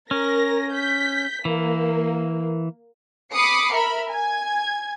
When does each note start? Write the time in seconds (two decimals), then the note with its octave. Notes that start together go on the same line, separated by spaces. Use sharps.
0.11 C#4 A#4 A#6
0.73 G6 B6
1.45 E3 A#3
3.32 B5 D6 D#6 C7 C#7
3.73 A#4 E5 B5
4.09 G#5 G#6